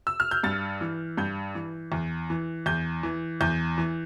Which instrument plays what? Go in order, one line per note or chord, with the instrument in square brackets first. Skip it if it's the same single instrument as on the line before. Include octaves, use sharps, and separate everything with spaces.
[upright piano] E6
F6
G6
G2 A6
E3
G2 G6
E3
E2
E3
E2 G6
E3
E2 G6
E3